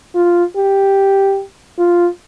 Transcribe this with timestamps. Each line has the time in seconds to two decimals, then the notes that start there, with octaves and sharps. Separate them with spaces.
0.15 F4
0.56 G4
1.78 F4